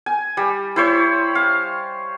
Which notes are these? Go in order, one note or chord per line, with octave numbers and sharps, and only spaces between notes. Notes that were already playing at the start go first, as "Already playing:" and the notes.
G#5
G3
E4 C5 C#5
F5